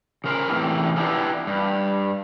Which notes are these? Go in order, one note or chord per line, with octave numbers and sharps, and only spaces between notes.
C#3 A#4 C5
E2 A2 C3 E3
G#3 A#3 B3 D4 E4 G4
G2